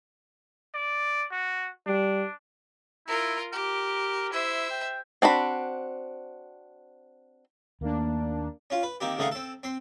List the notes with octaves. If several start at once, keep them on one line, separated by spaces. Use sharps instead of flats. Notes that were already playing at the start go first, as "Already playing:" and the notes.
D5
F#4
G3 D4
E4 F4 A#4
G4 A#4
E4 C5 E5
G5
C4 D4 F#4 B5
D#2 A3 A#3 D4
C#4 F4
B4
D#3 A#3 C4 G4
C#2 D#3 A3 D#5 F5 F#5
C4 A4
C4 C6